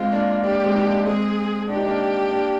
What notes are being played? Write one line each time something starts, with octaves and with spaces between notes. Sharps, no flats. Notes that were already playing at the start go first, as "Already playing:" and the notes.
Already playing: G#3 C4 F4
A#3 D4
A#3 D4 G4
G#3 C4
D#4
A#3 D4
G#3 C4 G#4
D4 G4
D#4
A#3 D4
A#3 D4